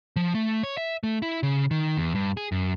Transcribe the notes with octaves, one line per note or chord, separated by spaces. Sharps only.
F3
A3
C#5
E5
A3
E4
C#3
D#3
E2
G2
G#4
F#2